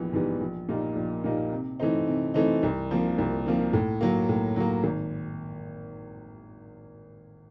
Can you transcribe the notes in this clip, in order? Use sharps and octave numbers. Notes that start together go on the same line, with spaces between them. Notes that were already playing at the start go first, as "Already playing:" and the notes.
Already playing: A#1 G#2 E3 G3 B3
G#2 E3 G3 B3
A#1
A#2 G3 A#3 D#4
A#1
A#2 G3 A#3 D#4
C3
E3 A3 C4 D#4
C3
E3 A3 C4 D#4
C2
C3 F3 A#3
C2
C3 F3 A#3
A2
F#3 A#3
A2
F#3 A#3
G#1